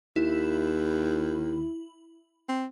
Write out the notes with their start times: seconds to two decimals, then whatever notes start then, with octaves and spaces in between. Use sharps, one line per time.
0.16 D#2 E4
2.49 C4